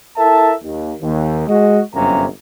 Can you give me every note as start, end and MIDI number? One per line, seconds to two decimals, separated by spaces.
0.17 0.52 64
0.17 0.52 69
0.17 0.52 70
0.17 0.52 76
0.17 0.52 81
0.62 0.92 39
1.01 1.45 39
1.47 1.79 56
1.47 1.79 66
1.47 1.79 75
1.93 2.25 31
1.93 2.25 42
1.93 2.25 48
1.93 2.25 58
1.93 2.25 61
1.93 2.25 82